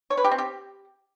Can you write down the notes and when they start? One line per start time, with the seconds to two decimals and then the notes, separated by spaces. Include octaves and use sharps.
0.10 C#5
0.17 B4
0.24 G4
0.31 C4
0.38 G4